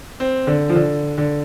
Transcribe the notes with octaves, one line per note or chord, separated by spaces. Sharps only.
C4
D3
F3
D3
D3